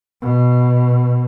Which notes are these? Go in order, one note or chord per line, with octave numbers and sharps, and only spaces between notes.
B2